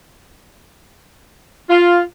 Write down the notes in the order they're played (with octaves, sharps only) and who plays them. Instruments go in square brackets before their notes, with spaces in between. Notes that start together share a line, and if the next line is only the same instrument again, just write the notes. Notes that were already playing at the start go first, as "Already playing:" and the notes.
[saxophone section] F4